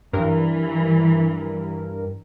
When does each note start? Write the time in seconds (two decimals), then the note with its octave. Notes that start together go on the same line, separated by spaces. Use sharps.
0.13 G2 E3 A#4